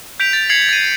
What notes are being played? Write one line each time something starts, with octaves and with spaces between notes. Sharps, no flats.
G6 B6 D7 F7
A6
G#6 C7 C#7 F7 F#7
A6 D#7